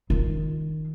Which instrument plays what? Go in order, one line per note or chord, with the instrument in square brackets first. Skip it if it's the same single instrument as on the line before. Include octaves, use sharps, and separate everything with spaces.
[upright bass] D#3 F4